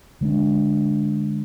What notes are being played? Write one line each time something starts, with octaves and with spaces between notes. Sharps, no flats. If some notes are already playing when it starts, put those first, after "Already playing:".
D3 G#3 D4